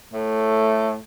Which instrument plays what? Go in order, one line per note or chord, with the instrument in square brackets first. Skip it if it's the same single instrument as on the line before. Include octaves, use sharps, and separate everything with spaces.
[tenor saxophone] A2 [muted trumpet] A3